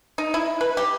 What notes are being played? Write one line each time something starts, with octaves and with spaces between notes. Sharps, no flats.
D#4
E4
B4
G4